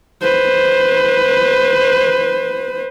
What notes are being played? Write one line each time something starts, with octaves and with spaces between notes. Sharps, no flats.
B4 C5